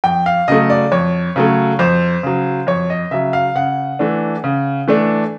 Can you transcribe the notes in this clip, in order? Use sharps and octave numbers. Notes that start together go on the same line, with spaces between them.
F2 G5
F5
C#3 F#3 A3 D#5
D5
F2 C#5
C#3 F#3 A3
F2 C5
C#3 F#3
F2 C#5
D#5
C#3 F#3 E5
F5
C#3 F#5
E3 A3 D4
C#3
E3 A3 D4